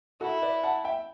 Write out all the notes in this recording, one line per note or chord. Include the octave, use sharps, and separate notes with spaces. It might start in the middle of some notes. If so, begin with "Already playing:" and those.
E4 F#4 A4
B4 D5
F#5 A5
E5 G5